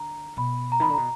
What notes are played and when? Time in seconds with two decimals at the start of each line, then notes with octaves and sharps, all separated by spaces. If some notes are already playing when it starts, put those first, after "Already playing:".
Already playing: D3 A#5
0.37 B2 B5
0.72 A#5
0.80 D#3 B5
0.90 D3
0.94 B2 A#5